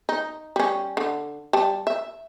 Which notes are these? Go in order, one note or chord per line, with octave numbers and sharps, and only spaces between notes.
D#4
G3 C#4
D3
G3 A5
E5